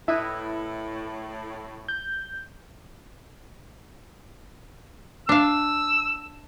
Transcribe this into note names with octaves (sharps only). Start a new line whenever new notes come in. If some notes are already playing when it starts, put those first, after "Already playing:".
A2 E4 B4 D#5 E5
G6
D4 F5 E6